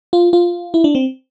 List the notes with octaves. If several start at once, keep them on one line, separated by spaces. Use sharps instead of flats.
F4
F4
E4
D4
C4